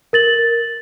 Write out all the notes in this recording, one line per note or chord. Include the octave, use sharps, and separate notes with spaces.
A#4 A6 F#7